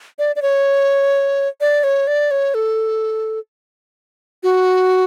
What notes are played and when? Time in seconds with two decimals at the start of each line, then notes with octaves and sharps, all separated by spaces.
0.19 D5
0.36 D5
0.42 C#5
1.61 D5
1.84 C#5
2.07 D5
2.31 C#5
2.54 A4
4.43 F#4